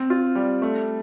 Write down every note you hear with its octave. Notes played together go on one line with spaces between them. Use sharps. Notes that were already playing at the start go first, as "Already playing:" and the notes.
Already playing: C4
F4
G3
A3